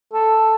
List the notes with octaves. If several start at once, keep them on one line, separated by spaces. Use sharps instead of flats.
A4